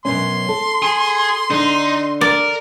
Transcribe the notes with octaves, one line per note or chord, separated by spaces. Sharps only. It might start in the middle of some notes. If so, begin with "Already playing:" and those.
F#2 B2 C#4 C6
A4
G#4
D3 D#4
A#4 D5